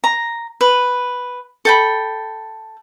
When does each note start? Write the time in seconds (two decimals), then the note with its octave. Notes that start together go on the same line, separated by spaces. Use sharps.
0.04 A#5
0.61 B4
1.65 A4 G5 B5